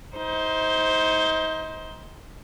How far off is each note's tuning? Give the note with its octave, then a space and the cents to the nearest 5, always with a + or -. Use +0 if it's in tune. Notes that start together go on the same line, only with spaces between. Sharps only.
D#4 +30 C5 +0